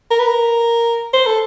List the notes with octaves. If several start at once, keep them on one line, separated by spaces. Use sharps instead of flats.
A#4
B4
A#4
C5
A4